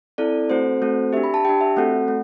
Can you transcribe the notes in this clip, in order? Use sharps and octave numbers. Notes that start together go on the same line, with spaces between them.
C4 E4 A4 D5
A3 C4 F#4 A4 C5
A3 C4 F#4 A4
D4 G4 E5
B5
A5
D4 G4 G5
E5
A3 C4 F#4 A4 F#5
A3